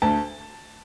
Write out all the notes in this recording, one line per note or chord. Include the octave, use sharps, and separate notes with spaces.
D2 A5